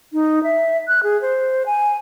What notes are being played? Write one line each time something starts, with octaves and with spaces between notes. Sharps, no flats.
D#4
E5
F#6
G#4
C5
G#5